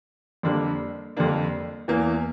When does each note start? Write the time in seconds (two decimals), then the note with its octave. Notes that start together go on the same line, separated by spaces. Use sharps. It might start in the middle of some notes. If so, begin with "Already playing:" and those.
0.43 F2 D3 G3 A#3 D4
1.17 F2 D3 G3 A#3 D4
1.88 E2 E3 A#3